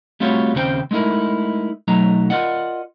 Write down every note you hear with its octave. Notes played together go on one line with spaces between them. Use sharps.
G3 A3 C4 F4 F#4 C#5
D#2 C#3 C4 A4 C5 G5
G#3 A3 D#4 E4 A#4
B1 F#3 A3 D#4 A#5
F4 A#4 D5 D#5 F#5